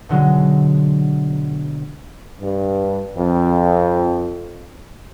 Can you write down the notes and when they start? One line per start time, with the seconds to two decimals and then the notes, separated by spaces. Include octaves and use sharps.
0.09 B2 D3 F#3 G#3
2.41 G2
3.16 F2